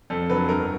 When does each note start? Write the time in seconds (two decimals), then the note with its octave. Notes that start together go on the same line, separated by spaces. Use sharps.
0.10 F2 A4
0.29 D3 F#3 B4
0.49 G1 A#4